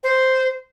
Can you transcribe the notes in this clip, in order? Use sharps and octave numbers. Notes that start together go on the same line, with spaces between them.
C5